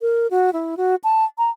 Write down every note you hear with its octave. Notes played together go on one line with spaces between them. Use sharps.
A#4
F#4
E4
F#4
A5
A#5